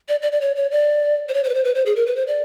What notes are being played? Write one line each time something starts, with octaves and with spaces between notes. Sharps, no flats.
D5
D5
D5
C#5
C#5
D5
C5
C#5
C5
B4
C5
B4
C5
G#4
A#4
B4
C5
D5